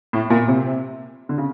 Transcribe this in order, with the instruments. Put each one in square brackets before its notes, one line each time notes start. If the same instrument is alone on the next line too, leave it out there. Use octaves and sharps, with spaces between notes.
[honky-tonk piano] A2
A#2
C3
D3
C#3